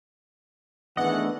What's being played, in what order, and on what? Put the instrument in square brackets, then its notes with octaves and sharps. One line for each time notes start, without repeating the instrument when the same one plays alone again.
[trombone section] D#3 E3 B3 [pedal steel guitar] A3 D4 D#5 [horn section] G#4 F#5